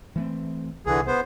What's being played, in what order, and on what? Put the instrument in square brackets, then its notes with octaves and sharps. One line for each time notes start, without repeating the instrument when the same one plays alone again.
[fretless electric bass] E3 A3 C4
[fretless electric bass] C2 [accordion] D3 E3 G#4
[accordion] B3 C5